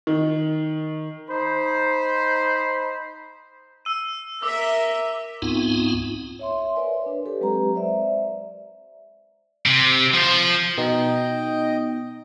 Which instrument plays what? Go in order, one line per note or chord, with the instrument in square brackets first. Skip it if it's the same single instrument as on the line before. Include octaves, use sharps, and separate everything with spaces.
[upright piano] D#3
[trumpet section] D#4 C5 B5
[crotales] E6 D#7
[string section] A#4 E5 [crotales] D6 E6
[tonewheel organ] C#2 G#2 B3 C4 D#4 F4
[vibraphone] C#5 E5 C6
A#4 B4 C#5 D5 E5 G#5
D4 B4
G4 A4 B4
F#3 G#3 C4 G4 B4 A#5
C5 D5 E5
[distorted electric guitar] C3
F3 C5
[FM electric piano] B2 D#4 [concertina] D#5 G5